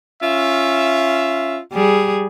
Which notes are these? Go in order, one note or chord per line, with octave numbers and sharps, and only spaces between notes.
C#4 F4 E5
G3 G#4